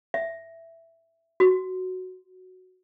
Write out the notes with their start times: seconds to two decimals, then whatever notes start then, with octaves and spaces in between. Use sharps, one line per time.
0.14 E5
1.40 F#4